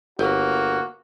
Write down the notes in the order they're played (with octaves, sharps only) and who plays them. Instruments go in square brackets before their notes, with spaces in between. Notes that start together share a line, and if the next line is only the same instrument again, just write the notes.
[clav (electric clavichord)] G1 [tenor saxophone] A#3 [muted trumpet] F#4